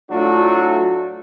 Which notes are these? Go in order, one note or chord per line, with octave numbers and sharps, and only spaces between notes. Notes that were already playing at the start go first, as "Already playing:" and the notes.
A2 F#3 A3 D4 F4 F#4